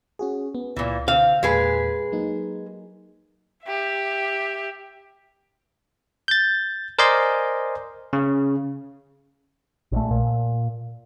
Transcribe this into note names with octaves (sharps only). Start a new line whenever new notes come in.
C#4 F#4 G#4
B3
C#2 A#2 E3
B2 D3 C4 F5
E2 A#2 G#3 G#4 B4
F#3 A#3 D#4
G4 E5
G6 A6
A#4 C5 D5 D#5 G#5 C6
C#3
A#1 A3
A#2